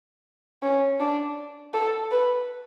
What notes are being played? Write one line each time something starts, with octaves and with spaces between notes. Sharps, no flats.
C#4
D4
A4
B4